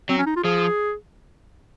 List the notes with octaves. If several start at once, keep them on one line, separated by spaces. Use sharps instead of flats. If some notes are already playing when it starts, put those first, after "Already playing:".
F#3 C4
C#4
D#4
F4
F3 G#4